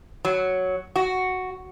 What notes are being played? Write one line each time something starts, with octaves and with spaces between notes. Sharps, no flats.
F#3
F#4